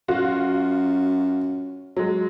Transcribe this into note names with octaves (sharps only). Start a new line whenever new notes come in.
F#2 F4 F#4
F#3 G#3